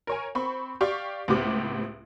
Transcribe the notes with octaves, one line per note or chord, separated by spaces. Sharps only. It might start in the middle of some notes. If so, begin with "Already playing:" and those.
A#4 C#5 G#5
C4 B5 C#6
G4 D5 F5 C#6
C#2 A2 B3 C4 G4 D6